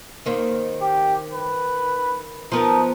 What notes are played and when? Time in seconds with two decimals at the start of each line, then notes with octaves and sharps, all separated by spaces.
0.26 D#3 A#3 C4
0.82 G4
1.33 B4
2.52 F3 B3 D#4 A#4